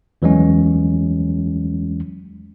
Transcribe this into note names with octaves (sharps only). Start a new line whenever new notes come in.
E2 E3 F#3 G#3 C#4